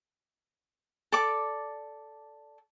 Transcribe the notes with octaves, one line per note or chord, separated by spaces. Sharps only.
A4 D5 D6